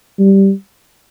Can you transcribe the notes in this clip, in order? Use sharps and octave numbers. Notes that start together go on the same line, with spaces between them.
G3